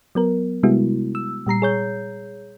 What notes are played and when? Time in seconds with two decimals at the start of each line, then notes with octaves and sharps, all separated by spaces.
0.15 F#3 B3 A#4
0.63 C3 G3 G#3 B3 E4 F#4
1.15 E6
1.46 A#2 G3 A#5 C7
1.62 G#4 C#5 G6